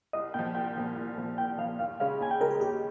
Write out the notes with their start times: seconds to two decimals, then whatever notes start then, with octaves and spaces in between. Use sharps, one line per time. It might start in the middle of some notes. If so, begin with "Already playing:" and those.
0.13 C2 D#5
0.34 A#2 F3 G5
0.55 C2 G5
0.76 A#2 F3
0.96 C2
1.18 A#2 F3
1.38 C2 G5
1.58 A#2 F3 F5
1.79 D#2 F5
2.00 C#3 G#3 C#4 G4 F5
2.20 D#2 G#5
2.31 G5
2.40 C#3 G#3 C#4 G4 A#4
2.51 G#4
2.61 D#2 G4